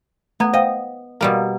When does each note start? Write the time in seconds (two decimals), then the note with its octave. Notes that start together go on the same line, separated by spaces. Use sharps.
0.40 A3 B3 A#5 G#6
0.53 C5 D#5 F5 G5
1.21 B2 G3 A#3 A#5